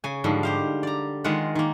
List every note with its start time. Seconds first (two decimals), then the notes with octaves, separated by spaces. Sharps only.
0.04 C#3 G#5
0.24 G#2 D3 F3 G3
0.43 G4 C5 F5
0.83 D5 A#5
1.24 D#3 G#3 F4 A#4 F#5 B5
1.55 D#3 A#3